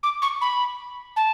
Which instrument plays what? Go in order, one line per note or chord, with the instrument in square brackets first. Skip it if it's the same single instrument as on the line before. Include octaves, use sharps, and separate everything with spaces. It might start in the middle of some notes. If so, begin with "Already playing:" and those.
[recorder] D6
C#6
B5
A5